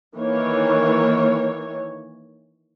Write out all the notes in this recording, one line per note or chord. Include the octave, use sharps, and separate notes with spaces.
D#3 E3 A#3 C#5